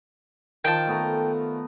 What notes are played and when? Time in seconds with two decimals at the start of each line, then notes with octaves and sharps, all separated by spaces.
0.65 D#3 F3 G5 A5
0.87 A3 B3 A#5